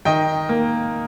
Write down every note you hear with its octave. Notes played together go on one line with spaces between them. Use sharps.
D#3 D#5 G5
A#3